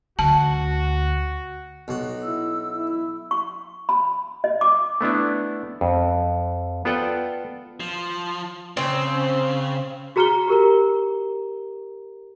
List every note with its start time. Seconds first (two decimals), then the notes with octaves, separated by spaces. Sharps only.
0.19 D2 F#4 A5
1.88 B1 F#4
2.23 E4 E6
2.71 E4
3.31 C#6
3.89 B5
4.44 D#5
4.61 D6
5.01 A3 B3 D4 E4
5.81 F2
6.85 B3 F4 A4 D5 F#5 G5
7.80 F3
8.77 C#3 C4
10.16 F#4 G#4 A#5 F6 C#7 G7
10.48 G4 A#4 A#5